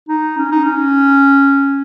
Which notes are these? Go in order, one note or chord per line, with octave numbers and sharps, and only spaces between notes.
D#4
C#4
D#4
C#4